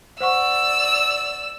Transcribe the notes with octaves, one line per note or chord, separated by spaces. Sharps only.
C5 D5 F#5 C#6 E6